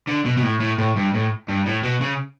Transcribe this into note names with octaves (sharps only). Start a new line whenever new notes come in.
D3
B2
B2
A2
A2
A2
G2
A2
G2
A2
B2
C#3